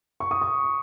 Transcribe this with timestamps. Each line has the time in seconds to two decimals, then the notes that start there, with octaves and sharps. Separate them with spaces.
0.20 C#6
0.31 D#6
0.41 C#6